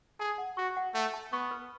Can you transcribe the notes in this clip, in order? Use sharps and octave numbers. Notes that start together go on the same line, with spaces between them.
G#4 A5
F#5
F#4 C#6
F#5
A3 F#5
A5
B3 C#6
B4